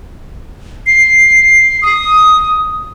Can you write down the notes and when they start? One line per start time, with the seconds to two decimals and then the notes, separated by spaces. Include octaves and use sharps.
0.87 C7
1.82 D#6